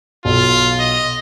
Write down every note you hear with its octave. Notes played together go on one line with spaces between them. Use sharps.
B1 F4
D#5